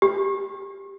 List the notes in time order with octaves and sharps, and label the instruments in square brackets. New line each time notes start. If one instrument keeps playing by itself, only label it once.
[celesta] G4